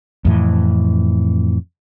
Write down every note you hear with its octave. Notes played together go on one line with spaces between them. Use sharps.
F2 A2 E3